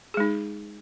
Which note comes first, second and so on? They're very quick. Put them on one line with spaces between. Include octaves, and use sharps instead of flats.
G#4 G#3 D#4